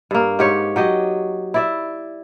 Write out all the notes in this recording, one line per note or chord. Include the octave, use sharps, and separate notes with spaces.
G2 A#3
G#2 G4 C#5
F#3 G4 D#5
E4 D5 E5